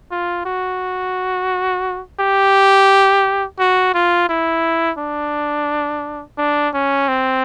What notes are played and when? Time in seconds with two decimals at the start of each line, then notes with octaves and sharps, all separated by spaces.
0.11 F4
0.45 F#4
2.20 G4
3.59 F#4
3.94 F4
4.29 E4
4.98 D4
6.38 D4
6.74 C#4
7.08 C4